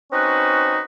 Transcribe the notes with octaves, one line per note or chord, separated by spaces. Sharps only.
C4 C#4 D#4 F#4 B4